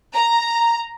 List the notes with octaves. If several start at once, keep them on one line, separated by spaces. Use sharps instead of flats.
A#5